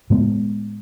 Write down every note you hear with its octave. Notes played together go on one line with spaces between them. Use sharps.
A2 G#3 B3